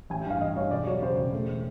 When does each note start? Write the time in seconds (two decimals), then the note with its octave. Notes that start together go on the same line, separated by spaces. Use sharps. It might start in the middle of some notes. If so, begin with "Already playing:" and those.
0.10 A1 G#5
0.21 G5
0.26 G2 F5
0.41 A1 D#5
0.56 G2 C#5
0.71 E1 D5
0.87 F#3 C#5
1.02 C#3 C5
1.18 E1
1.33 A3